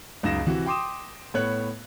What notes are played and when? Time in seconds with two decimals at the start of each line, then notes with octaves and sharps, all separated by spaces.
0.23 C#2 F#2 D#4 A#6 E7
0.46 C3 E3 F#4
0.66 G5 C6 D6 D#6 E7
1.34 A2 B3 C#5 F#6